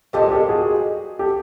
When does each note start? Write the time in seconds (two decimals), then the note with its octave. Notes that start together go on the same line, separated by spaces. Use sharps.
0.13 A#2 F3 G#3 G4 A4
0.23 G#4 A#4
0.31 G4 A4
0.49 F#4 G#4
1.19 G4 A4